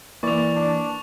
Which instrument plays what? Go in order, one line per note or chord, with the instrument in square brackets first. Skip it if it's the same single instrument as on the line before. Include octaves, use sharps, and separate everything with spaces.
[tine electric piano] E3 E4 D5 [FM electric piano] A#3 [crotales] C#6 F7
[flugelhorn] D4